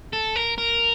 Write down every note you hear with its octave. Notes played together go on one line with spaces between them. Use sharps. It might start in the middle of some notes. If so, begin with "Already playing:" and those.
A4
A#4
A#4